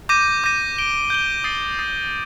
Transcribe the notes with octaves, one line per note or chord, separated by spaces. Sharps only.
D6 G6 A#6 D#7
D6 G6 A#6 D#7
G6 D7 G7
G6 D7 G7
D#6 A6 C7
D#6 A6 C7